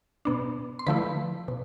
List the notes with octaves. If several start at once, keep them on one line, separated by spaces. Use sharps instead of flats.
B2 B3 D4
C6
D3 F3 A3 E4 B4 B5
B2